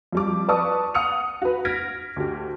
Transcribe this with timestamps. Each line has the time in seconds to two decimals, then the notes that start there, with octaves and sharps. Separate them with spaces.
0.12 F2 G3 D6
0.48 B4 D5 A5 C#6 D#6
0.94 F#5 D#6 C#7 F7
1.42 F#4 B4
1.65 F6 G#6 A#6 B6 D7
2.16 D2 G4